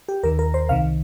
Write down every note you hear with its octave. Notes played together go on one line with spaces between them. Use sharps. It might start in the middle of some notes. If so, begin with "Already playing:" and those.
G4
D#2 D#3 A#4
A#4
C5
C2 C3 D#3 F5